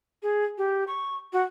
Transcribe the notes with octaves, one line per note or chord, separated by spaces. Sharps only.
G#4
G4
C#6
F#4